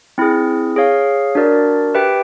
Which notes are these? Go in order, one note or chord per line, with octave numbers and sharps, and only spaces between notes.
C4 E4 G#4
G#4 C#5 F5
D4 F#4 A#4 D5
G4 B4 E5 G5